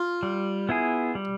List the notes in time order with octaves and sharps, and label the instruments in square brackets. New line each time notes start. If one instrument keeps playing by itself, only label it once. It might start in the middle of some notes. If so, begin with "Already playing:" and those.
Already playing: [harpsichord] F4
[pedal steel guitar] G3
B3 E4 G#4
G3